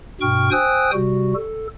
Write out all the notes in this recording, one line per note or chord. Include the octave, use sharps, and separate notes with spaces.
G2 B2 G5 C#6 F6
C5 G5 G#5 D#6 E6 F#6
C3 G3 F#4
A4